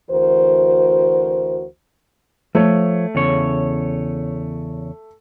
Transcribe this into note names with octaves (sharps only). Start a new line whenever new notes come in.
D2 E3 F#4 A#4 C5
F3 A3 C#5
E2 C#3 C#5